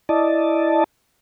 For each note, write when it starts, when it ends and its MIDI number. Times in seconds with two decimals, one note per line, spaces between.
0.09 0.84 64
0.09 0.84 74
0.09 0.84 75
0.09 0.84 81